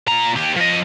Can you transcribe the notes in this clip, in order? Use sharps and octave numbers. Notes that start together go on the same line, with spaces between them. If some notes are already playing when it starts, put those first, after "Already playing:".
A#2 A#5
D#2 G4
F3 D#5